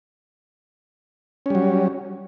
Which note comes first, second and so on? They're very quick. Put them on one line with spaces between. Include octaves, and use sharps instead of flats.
C#4 G3 F#3